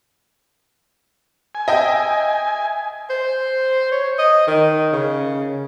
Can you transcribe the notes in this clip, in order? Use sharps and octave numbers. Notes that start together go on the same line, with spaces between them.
G#5
D#5 E5 G5
C5
C#5
D#5
D#3
C#3